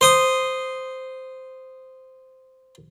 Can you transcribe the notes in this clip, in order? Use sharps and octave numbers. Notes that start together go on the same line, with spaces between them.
C5 D#6